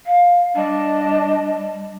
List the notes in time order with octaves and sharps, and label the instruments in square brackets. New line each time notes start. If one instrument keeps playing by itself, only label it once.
[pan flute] F5
[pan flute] G3 [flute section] D4 D#5 A5